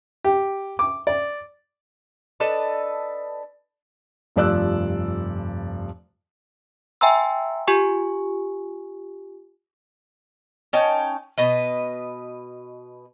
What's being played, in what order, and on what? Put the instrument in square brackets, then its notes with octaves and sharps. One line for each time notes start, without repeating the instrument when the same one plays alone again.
[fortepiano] G4
D6
D5
[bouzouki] D4 A4 B4 D#5
[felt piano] F1 G2 F3 D5 E6 F#6
[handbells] E5 G5 G#5 A#5 C6 E6
F4 G4 G#5 C#6
[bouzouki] C#4 D#4 G5 A5
B2 B4 D#5